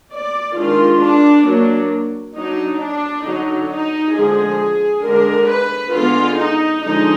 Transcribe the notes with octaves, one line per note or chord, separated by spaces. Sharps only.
D5
D#3 G#3 D4 F4
D4
F#3 A#3 D4
F#3 D4 D#4
D4
D3 F#3 D4 D#4
D#4
D3 F3 G#3 G#4
D3 G#3 D4 A#4
B4
D3 G#3 B3 F4
D#4
D3 F3 G#3 D#4